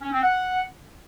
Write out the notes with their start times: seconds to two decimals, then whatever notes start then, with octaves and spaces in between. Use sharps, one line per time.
0.01 C#4
0.12 C4
0.23 F#5